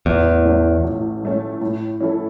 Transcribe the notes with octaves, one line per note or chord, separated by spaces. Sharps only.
A1 E2
A2 A3 C#4
A1
A2 A3 C#4
A2
E3 C#4 E4 A4